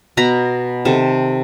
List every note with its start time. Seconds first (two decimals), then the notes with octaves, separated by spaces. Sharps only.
0.17 B2 B3 A#5 B5
0.85 C3 D#3 A4